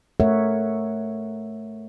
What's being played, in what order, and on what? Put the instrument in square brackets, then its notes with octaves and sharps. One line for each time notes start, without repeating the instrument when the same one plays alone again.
[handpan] A3 A#4 C#5 E5 F#5